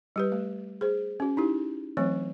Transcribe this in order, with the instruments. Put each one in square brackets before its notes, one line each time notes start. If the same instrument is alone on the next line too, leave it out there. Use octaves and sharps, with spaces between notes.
[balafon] G3 G4 B4
A3
G#4 C5
C#4 F#4
D#4 E4 G4
E3 F#3 A3 C4 C#5